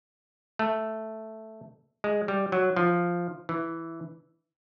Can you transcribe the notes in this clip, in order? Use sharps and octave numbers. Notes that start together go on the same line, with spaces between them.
A3
G#3
G3
F#3
F3
E3